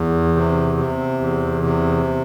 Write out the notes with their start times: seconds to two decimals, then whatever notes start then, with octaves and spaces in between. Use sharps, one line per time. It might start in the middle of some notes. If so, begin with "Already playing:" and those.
Already playing: E2
0.35 C3
0.77 C3
1.20 E2
1.63 C3